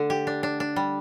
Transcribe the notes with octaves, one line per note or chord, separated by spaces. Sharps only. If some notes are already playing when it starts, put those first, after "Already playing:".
Already playing: D3 A3 D4
G4
D4
D4
D4
G3